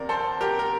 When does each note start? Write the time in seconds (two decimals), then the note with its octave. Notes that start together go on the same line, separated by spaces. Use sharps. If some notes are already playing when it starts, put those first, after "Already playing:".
Already playing: E2 C3 C4 A#4 D5
0.09 A4 C5
0.41 G4 A#4
0.59 A#4